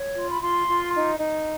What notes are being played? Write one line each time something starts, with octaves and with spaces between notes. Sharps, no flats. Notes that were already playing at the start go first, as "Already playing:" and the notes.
Already playing: C#5
F4
B5
F4 C6
F4
D#4
D#4